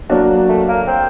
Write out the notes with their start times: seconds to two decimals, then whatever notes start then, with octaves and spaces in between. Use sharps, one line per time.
0.10 F#3 A#3 D4 F#4
0.49 A3
0.68 A#3
0.88 C4